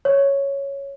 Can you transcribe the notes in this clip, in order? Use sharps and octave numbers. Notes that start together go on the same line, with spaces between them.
C#5